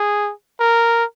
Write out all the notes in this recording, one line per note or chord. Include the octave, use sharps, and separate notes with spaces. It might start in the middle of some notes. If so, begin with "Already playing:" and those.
Already playing: G#4
A#4